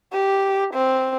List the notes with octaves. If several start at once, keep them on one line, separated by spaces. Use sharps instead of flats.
G4
C4